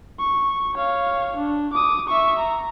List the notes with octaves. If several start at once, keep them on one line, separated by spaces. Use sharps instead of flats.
C#6
C#5 F5
D4
D6 D#6
E5 C#6
A#5